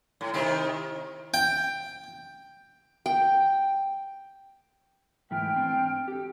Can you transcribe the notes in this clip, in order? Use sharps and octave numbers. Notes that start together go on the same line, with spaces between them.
A2
C3 D#3 E4
G5
G5
G#2 E3 A3 G5 F6
C4 D4
G4 A4